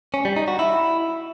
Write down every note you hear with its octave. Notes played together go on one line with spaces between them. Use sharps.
C#4
G3
D#4
F#4
E4